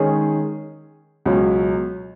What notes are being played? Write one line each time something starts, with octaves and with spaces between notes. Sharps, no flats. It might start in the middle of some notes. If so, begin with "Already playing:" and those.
Already playing: D#3 G#3 C#4 G#4 C#5
C#2 B2 F#3 C#4